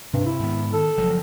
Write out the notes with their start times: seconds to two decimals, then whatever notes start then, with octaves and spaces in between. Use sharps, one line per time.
0.13 G2 C3
0.25 E4
0.39 G#2 D#3 B3
0.73 D#3 A4
0.97 F#1 F3 F#3